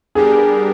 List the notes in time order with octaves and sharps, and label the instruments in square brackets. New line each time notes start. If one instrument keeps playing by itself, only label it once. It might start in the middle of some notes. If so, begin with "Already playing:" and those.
[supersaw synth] G3 B3 D4 G4 A#4 [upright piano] G#4